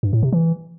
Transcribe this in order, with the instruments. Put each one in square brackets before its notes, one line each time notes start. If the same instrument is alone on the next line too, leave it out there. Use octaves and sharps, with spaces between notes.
[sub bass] G2
A2
C3
E3